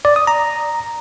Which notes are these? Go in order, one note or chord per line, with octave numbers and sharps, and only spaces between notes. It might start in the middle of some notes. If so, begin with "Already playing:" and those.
D5
D#6
A#5